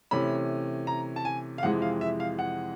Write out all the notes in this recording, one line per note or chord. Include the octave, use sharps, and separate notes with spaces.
C3 E3 A3 C#4 B5
A#5
A5
G#5
F5
F2 C3 E3 G#3 F#5
F5
E5
F5
F#5